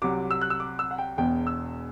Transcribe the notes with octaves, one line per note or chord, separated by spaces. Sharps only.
C2 C3 F#3 D6
E6
F#6
E6
D6
E6
F#5
G5
E1 E2 B2 G5
E6